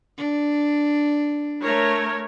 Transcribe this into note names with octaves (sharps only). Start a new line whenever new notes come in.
D4
A3 A#4 C#5